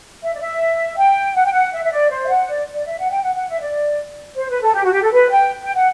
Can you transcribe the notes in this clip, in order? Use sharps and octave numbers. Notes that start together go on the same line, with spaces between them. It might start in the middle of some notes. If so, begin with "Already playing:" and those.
E5
D5
E5
G5
F#5
G5
F#5
E5
E5
D5
C5
E5
F#5
D5
D5
E5
F#5
G5
F#5
F#5
E5
D5
C5
B4
A4
G4
F#4
G4
A4
B4
G5
G5
F#5